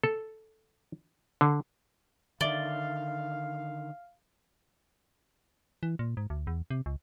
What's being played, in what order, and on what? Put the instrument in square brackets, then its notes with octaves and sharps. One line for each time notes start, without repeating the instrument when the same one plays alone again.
[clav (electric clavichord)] A4
D3
[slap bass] D3 D#3 [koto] D5 [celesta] E5 A6 G7 [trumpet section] F5
[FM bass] E3
A#2
G#2
D2
E2
C3
C#2